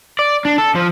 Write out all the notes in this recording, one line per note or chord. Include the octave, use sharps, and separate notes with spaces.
D5
D4
A4
F3